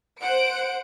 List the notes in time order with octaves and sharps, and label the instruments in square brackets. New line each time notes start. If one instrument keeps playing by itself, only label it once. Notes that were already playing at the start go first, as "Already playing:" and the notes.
[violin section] C5 F#5 D7